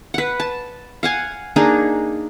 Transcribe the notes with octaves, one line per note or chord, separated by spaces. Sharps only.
B4 F#5
A5
F5 F#5 G#5
A#3 D4 D#4 G#4